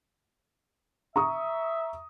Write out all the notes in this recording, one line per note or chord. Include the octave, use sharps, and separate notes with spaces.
E5 A#5 C#6 D#6